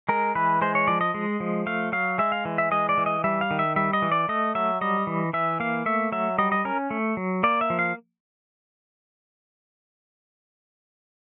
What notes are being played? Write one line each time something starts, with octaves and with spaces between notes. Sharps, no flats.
G#3 A#4
E3 B4
G#3 C5
C#5
F3 D5
D#5
G#3
F3
A3 F5
F#3 F5
G#3 E5
F5
E3
E5
G#3 D#5
D5
E3
D#5
G3 E5
F5
D#3
E5
G3 E5
D#5
E3
D5
A3 D#5
F#3 E5
G3 D#5
E3
E3 E5
A#3 F5
A3 E5
F#3 E5
G3 D#5
D#5
C#4 A#4
A3
F#3
A#3 D5
E5
F3
F5